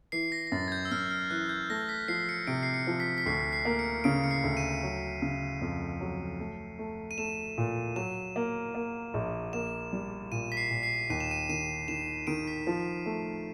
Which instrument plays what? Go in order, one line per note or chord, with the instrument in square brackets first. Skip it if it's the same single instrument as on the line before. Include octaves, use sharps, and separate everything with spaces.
[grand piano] E3 [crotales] C7
[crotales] A#6
A#6
[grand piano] F#2 [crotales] A6
[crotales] G#6
G6
E6
[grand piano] F#2 [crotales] F6
[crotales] F6
[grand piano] E3 [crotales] F#6
[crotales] G6
[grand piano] A3 [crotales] A#6
[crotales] B6
[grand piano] F3 [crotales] C7
[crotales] C#7
[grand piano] C3 [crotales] D7
[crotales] C7
C#7
[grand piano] F3
[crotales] B6
B6
[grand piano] D2 [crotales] C7
[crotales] C7
[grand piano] A#3
[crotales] C#7
[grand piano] C#3 [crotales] D7
[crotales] C#7
C7
[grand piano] D2
[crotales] D#7
[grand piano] F#3
C#3
F2
F#3
A3
A3
[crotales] D#7
[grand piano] A3 [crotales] E7
[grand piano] A#2
[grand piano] F#3 [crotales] E7
[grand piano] A#3
A#3
A#1
[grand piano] A#3 [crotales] E7
[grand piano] G3
[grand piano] A#2 [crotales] D#7
[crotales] B6
C7
[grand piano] A#2
[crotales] C7
[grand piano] D#2 [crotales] D#7
[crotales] E7
D#7
[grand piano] D#3 [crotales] D#7
[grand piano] D#3 [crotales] E7
[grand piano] D#3 [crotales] D7
[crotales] B6
[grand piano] F3
A3